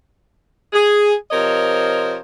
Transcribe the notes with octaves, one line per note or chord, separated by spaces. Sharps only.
G#4
C3 F3 A#4 C5 C#5 D#5